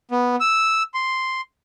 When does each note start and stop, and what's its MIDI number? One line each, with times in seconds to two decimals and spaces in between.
0.11 0.36 59
0.40 0.83 88
0.94 1.41 84